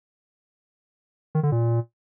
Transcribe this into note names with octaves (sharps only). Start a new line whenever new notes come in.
D#3
D3
A#2